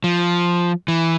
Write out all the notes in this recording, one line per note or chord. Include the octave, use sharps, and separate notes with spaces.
F3
E3